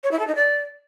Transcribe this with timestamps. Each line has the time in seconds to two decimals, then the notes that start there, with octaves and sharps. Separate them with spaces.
0.03 C#5
0.11 E4
0.19 A4
0.27 D#4
0.35 D5